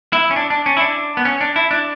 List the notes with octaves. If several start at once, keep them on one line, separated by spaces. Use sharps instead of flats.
E4
C#4
D4
D4
C#4
E4
D4
B3
C#4
D4
E4
D4